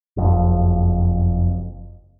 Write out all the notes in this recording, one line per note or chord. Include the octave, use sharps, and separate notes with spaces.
F#1 F2